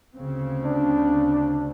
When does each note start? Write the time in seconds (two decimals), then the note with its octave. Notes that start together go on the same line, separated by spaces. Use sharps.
0.15 D2 C#3 C4
0.65 D4